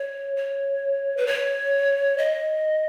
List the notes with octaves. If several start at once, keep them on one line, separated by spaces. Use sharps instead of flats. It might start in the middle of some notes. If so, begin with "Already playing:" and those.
Already playing: C#5
C#5
B4
C#5
D#5